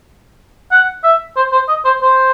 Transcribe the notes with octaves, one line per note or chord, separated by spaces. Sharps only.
F#5
E5
C5
C5
D#5
C5
C5